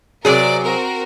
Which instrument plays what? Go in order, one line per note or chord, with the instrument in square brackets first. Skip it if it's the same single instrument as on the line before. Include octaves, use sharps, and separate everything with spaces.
[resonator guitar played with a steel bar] C3 F#3 G#4 [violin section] A#4 C5 D5
[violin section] C4 F#4 A#4